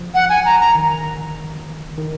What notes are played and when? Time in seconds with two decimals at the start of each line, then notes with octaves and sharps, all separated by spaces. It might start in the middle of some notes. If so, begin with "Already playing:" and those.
Already playing: F3
0.15 F#5
0.29 G#5
0.45 A#5
0.61 A#5
0.75 D#3
1.98 D#3